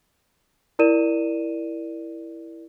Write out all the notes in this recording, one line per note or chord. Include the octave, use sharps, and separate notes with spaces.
E4 A#4 D5 D#7 E7